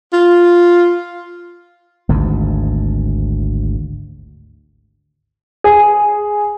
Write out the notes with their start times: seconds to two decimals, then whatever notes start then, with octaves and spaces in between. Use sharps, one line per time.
0.13 F4
2.09 G#1 D2 G#2
5.64 G#4